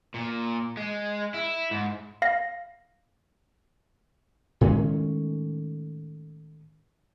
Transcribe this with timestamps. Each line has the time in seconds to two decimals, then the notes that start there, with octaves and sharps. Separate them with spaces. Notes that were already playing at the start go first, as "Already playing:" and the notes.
0.14 A#2
0.77 G#3
1.34 E4
1.71 G#2
2.22 F5 A#6
4.61 A2 D#3 G#3 C#4